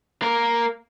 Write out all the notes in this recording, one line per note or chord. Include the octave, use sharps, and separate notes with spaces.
A#3 A#4